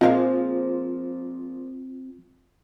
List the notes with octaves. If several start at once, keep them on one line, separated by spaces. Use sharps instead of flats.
A#2 F3 G#3 C4 D#4 F4 A#4 F5